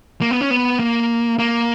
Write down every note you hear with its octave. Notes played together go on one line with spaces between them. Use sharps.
A#3
B3
C#4
B3
A#3
A#3